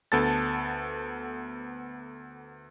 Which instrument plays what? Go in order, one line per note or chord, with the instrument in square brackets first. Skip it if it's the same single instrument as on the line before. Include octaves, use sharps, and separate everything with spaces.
[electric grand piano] D2 B3 A4 A5 A6